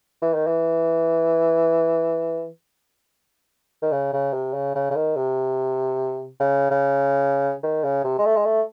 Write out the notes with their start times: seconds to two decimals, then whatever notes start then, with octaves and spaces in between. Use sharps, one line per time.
0.22 E3
0.34 D#3
0.47 E3
3.82 D#3
3.92 C#3
4.13 C#3
4.33 C3
4.54 C#3
4.75 C#3
4.90 C#3
4.95 D#3
5.17 C3
6.40 C#3
6.70 C#3
7.63 D#3
7.84 C#3
8.04 C3
8.18 G#3
8.25 A3
8.36 G#3
8.45 A3